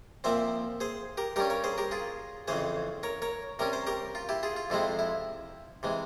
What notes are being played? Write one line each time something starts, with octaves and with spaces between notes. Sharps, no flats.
A#2 F3 C4 C5 E5
G#4 C5
G4 A#4
G2 G3 C#4 G4 A#4
A#4 C#5
G#4 C5
G4 A#4
F4 G#4
F2 C#3 E3 G#4 C5
A#4 C#5
A#4 C#5
C3 G3 C#4 A#4
C5
G4 A#4
F4
E4 G4
F4 G#4
F4
F2 C3 F3 G#3 C4 E4
E4
C3 E3 G#3